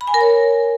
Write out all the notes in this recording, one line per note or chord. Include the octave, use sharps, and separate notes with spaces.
B5
G#5
A#4
C#5